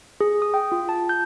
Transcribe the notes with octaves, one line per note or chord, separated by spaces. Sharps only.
G#4
D#6
G5
F4
A5
G6